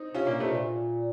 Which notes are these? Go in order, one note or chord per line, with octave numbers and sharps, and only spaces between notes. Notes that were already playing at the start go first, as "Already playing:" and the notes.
Already playing: C4 D#4
C3 C#4 F4
A#2 A#3 C#4
C3 A3 C4
A#2